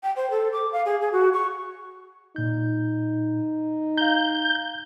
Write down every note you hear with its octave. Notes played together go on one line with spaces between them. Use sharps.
G5
C5
A4
D6
F5
G#4
G#4
F#4
C#6
A#2 D#4 G6
F5 A#5 G6